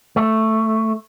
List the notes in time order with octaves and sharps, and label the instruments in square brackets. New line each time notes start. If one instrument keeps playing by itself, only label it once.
[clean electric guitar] A3